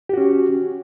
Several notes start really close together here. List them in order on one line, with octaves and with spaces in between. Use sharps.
G4 F#4 C#4